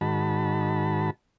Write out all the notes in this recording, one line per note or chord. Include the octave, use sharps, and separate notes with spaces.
G#2 D#3 F#4 A5 B5